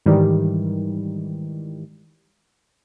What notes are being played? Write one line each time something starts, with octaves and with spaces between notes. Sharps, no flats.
G#2 D#3 E3 G3